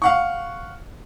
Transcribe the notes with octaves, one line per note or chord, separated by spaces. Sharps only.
F5 F#5 C#6